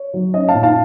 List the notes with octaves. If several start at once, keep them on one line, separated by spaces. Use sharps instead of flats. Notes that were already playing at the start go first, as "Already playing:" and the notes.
Already playing: C#5
F#3
C#4 D#5
F5 A5
A#2
F5 A5